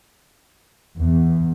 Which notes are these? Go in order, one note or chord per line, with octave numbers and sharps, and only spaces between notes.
E2